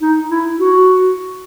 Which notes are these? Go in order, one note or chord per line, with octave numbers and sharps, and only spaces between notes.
D#4
E4
F#4